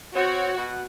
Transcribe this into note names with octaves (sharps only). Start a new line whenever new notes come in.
C4 F#4 C#5
B2 F#5